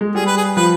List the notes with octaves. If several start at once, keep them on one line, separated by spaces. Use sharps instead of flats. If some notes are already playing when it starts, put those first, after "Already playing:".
G#3
G3 G#4
B4
G#4
F3 B4